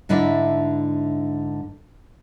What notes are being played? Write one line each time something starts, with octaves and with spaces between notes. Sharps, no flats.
G#2 D3 D4 E4 E5